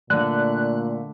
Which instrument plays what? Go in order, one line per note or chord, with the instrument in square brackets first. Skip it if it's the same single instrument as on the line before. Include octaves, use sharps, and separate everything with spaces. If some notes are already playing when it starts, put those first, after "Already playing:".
[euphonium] A#2 [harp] D3 [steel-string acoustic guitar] A3 [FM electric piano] F#6